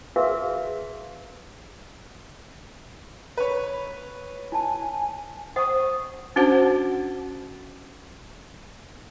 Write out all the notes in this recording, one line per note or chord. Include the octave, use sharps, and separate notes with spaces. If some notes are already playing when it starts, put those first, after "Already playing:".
F#4 G#4 A#4 B4 E5 F5
B4 C#5
E4 G#5 A5
C5 F#5 C#6 D#6
C#4 D4 F#4 C5 F#5